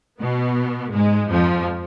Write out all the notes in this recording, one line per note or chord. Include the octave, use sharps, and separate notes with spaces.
B2 B3
G#2 G#3
F2 F3